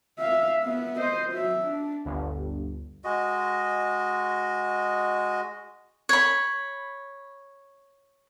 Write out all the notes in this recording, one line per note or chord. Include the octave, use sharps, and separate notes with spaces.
E5 F5
B3 E5
C5 D#5
F#3 E5
D4
G1 D2
G#3 F#4 D#5
C#5 B5